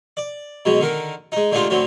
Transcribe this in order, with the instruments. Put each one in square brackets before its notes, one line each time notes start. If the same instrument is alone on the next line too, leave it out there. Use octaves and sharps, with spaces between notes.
[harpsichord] D5
B2 F#3 G#3
D3 D#3 A#4
G#3 D#4
D3 G#3 A3 D#4 F4 G4
A2 D3 F#3 C4